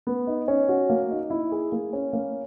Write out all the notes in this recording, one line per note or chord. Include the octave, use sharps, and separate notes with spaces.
B3
D#4
C#4
F#4
A#3
D#4
E4
G#4
A#3
C#4
A#3